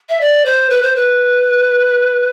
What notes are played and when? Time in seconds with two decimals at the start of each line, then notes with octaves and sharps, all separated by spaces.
0.09 E5
0.21 D5
0.45 C5
0.70 B4
0.82 C5
0.96 B4